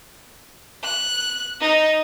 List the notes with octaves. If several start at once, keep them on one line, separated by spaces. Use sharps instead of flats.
F#6
D#4